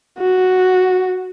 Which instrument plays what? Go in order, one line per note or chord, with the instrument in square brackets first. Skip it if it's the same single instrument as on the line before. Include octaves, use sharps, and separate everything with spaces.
[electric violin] F#4